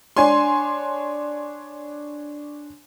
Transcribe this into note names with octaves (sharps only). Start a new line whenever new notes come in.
D4 C#5 G#5 C6